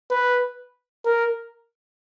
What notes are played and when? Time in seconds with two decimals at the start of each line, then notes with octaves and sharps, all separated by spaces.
0.11 B4
1.06 A#4